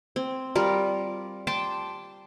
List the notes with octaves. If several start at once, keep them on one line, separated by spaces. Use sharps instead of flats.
C4
G3 F4 A#4
G5 A5 C6 D6